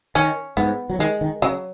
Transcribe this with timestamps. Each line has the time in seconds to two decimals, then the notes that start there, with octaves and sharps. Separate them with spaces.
0.15 D#3 C#4
0.57 G#2 B3
0.90 F#3
0.99 D#3 G#3
1.21 D#3
1.42 C#3 F#3